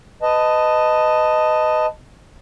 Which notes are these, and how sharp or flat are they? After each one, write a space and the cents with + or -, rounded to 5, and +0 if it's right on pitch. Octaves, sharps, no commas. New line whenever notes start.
B4 +15 D#5 +0 A5 +5